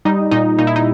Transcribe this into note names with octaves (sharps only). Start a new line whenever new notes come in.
G3 D#4
A#2 D#4
A#2 D#4
E4
D#4